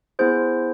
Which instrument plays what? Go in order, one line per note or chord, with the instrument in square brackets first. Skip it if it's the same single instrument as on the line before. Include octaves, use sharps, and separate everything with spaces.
[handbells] B3 E4 G#4 C5